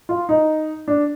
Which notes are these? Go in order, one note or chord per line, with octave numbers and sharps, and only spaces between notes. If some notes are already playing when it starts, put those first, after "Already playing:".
F4
D#4
D4